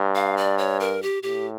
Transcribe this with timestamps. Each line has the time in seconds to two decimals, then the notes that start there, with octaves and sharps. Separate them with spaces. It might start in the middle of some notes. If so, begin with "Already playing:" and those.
Already playing: G2
0.15 F5
0.37 D5
0.58 C#5
0.80 A#4
1.02 G4
1.23 A2 G4